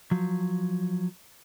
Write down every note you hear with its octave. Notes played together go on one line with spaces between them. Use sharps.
F3 F#3